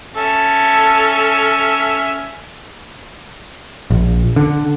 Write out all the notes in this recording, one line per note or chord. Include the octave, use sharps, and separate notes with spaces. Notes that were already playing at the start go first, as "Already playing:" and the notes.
C#4 A4 E5
A#1
D3